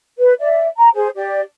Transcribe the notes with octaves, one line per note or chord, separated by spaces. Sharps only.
B4
D5 E5
A#5
G#4 C5
G4 D5